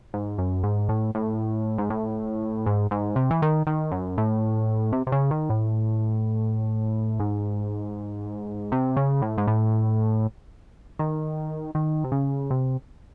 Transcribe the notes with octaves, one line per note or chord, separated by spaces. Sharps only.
G#2
F#2
G#2
A2
A2
G#2
A2
G#2
G#2
C3
E3
D#3
D#3
F#2
A2
C3
C3
C#3
D#3
A2
G#2
C3
C#3
A2
G#2
A2
D#3
D#3
C3
C#3
C3